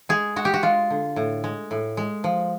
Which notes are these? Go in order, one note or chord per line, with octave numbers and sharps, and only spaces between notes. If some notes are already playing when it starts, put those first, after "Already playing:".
G#3 G#4
G#3 F#4
G4
F#4
G#3 F4
D3
A2
G#3
A2
G#3
F3